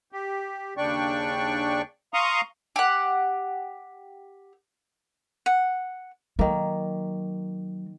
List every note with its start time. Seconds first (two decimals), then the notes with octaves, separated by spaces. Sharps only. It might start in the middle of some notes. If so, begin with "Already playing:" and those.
0.12 G4
0.77 D#2 C#3 D4 D5 G5 C#6
2.14 F5 A#5 C6 C#6 D#6
2.76 G4 F#5
5.46 F#5
6.39 D#3 F#3 A#3